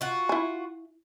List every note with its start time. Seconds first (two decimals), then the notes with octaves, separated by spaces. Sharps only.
0.01 F4 F#4
0.29 E4 G#5